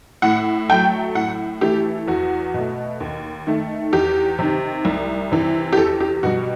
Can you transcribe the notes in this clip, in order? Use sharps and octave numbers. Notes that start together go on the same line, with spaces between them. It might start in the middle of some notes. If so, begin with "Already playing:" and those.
A2 F#5
F#3 A3 G5
A2 F#5
E3 A3 G4
E2 F#4
B2 A3
D#2
D#3 A3
E2 G4
C3 D#3
C2
C3 E3
G4
E2 A4
G4
B2 G3 F#4